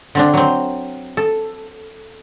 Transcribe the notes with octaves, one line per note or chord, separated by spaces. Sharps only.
D3 C4 D4
F#3 C4
A4